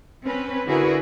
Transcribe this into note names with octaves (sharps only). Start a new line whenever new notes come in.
C4 C#4 B4
D3 E4 F#4 G#4 A#4 B4